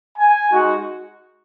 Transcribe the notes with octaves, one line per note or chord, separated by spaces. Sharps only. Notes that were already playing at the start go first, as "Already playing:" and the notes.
G#5
G#3 D#4 F#4